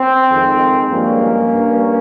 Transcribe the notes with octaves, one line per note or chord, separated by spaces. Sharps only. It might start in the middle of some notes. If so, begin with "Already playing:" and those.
Already playing: C4
F2 D#3 G#3
G2 F3 G#3 A#3 C#4
G2 G3